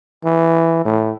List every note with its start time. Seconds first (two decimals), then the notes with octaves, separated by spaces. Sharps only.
0.25 E3
0.85 A2